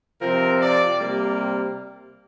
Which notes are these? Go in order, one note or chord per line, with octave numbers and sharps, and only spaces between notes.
C3 F3 C4 A#4
D5
C3 G3 A#3